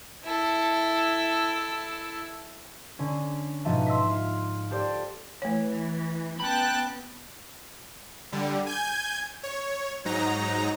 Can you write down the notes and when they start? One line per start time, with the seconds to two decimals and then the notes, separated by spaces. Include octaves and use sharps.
0.25 E4 A4
2.99 D3 C#4
3.65 G#2 B2 F3 D#5 E5 A5
3.87 C6 E6 A#6 B6
4.11 F4
4.71 G4 A4 C5 D5
5.42 E3 A3 C#5
6.40 B3 C#4 G5 A5 B5 F#6
8.32 D3 G3
8.66 G#5 G6 G#6
9.43 C#5
10.05 G#2 F#3 D#4 A#5